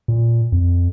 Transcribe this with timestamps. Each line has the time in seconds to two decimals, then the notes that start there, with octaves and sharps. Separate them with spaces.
0.08 A#2
0.52 F2